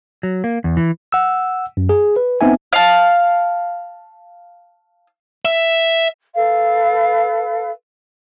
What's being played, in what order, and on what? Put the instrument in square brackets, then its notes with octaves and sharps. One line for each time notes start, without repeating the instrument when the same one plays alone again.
[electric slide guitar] F#3
A#3
E2
E3
[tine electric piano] F#5 E6
F#2
G#4
B4
B3 C4 D#4 E5 G#5
[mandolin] F5 A5
[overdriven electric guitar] E5
[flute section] A4 B4 F5